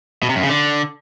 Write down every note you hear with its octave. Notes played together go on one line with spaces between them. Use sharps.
B2
C3
F#2
C#3
D3